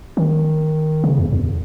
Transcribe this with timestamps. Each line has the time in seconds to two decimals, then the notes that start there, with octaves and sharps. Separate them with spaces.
0.17 D#3
1.04 C#3
1.18 E2
1.33 E2